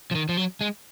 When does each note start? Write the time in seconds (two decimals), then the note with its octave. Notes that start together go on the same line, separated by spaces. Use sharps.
0.11 F3
0.15 D#3
0.29 F3
0.37 F#3
0.61 G#3